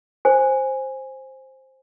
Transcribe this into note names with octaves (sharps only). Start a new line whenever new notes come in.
C5 G#5